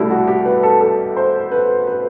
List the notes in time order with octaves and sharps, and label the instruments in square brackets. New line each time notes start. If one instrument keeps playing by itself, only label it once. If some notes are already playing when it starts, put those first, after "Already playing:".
Already playing: [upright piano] C2 B2 G3 A3 E4
F#4
G4
B4
A4
A4
C5
B4
B4